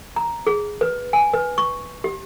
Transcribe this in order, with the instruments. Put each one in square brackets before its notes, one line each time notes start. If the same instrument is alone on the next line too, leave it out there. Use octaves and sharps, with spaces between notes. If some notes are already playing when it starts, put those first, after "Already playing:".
[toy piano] A#5
G#4
B4
G#5
B4
C#6
G4